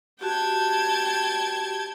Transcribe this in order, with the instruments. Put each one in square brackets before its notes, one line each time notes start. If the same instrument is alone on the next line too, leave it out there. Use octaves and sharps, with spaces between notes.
[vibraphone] F#4 G4 [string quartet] G5 A5 G#6